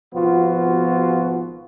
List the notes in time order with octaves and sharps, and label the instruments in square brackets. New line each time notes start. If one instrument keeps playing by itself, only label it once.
[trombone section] G#1 B2 F3 B3 F4 F#4